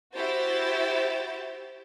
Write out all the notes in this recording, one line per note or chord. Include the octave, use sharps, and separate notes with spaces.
E4 F#4 G4 C5 G6 A6